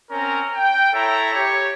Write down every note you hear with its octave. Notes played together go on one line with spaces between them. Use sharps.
C4 C#4 A#4 A#5
G5
E4 A4 C#5 E5 A#5
G4 C#5